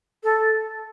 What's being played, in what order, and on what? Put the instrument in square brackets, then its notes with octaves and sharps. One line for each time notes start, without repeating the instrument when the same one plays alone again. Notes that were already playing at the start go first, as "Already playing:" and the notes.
[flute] A4